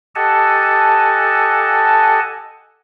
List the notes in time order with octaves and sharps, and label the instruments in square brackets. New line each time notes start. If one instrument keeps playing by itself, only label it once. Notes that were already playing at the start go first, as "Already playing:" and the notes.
[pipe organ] G4 A4 D#5 F#5 G#5 A5